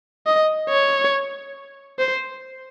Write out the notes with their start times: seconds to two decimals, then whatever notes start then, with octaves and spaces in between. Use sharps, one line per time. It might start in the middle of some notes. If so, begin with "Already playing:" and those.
0.26 D#5
0.69 C#5
1.99 C5